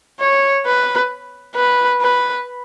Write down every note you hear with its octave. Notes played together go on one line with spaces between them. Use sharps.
C#5
B4
B4
B4